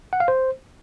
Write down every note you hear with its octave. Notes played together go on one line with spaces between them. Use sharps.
F#5
F5
C5